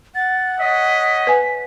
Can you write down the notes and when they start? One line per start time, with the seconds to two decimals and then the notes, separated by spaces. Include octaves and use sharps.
0.15 F#5 A6
0.59 C#5 D#5 B6
1.27 B4 G#5